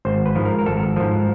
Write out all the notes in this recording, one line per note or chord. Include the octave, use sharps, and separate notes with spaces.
G#1 C5
B4
G#2 F3
A#4
A#4
G#1 A4
G#2 F3